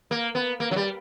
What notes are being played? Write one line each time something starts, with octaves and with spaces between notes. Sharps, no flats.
A#3
B3
A#3
F#3
G3